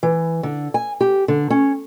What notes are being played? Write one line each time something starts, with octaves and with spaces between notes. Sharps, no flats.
E3
D3
G#5
G4
D3
C#4